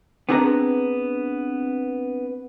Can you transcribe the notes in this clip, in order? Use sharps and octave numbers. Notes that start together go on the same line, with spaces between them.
B3 C4 D4 G#4 B4 A#5